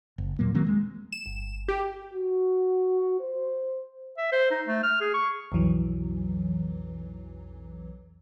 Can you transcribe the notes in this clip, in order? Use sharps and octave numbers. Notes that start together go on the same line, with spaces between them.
F#1
D#2 A#2 F#3 A#3
D#3 F#3 A#3 C4
G#3
E7
G1
G4
F#4
C5
E5
C5
D#4
A3
F6
G#4
C#6
B1 F2 E3 F#3